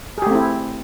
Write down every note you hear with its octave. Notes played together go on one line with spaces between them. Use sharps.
A3 C4 E4 G4 G#4